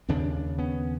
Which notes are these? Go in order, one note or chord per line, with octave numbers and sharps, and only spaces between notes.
D#2 C#3 C4 D4
B3 C#4